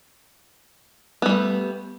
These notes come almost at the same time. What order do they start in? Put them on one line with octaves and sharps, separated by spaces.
B3 G3 A3